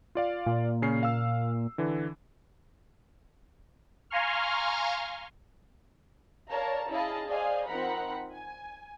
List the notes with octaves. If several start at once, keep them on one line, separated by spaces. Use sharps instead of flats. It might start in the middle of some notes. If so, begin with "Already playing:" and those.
F4 D5 F5
A#2
C#3 C#4 C7
F5 E6
D3 E3
F5 G#5 A#5 C6 C#6 F6
A#4 C#5 D5 F5 A5 A#5
C#4 E4 G#4 D#5 F5 A5
G#4 C5 D5 D#5 F5 G#5
F3 C4 D#4 A#4 F#5 B5
G#5